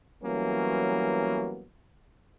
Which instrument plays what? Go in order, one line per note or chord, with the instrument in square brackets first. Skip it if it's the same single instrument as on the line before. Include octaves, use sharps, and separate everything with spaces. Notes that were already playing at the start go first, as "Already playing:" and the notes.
[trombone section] E3 F#3 G3 A#3 B3 C#4